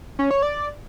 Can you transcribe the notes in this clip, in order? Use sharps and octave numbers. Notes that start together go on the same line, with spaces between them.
C#4
C#5
D5